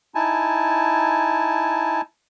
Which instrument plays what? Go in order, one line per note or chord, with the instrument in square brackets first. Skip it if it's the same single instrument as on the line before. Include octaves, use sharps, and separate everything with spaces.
[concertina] D#4 E4 G#5 A5